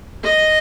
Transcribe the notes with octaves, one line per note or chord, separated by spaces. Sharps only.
D#5